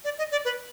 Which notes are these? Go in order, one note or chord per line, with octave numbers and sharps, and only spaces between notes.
D5
D#5
D5
B4